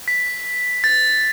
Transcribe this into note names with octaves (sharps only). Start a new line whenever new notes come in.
B6
A6